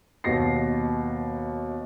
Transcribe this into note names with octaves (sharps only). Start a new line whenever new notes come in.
D#2 B2 B3 A#6 C7